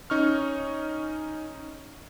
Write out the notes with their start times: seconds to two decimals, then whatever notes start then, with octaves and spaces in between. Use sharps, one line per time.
0.10 C#4 D#4 C#6 F6